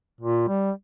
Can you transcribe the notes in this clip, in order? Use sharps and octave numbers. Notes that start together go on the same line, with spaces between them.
A#2
G3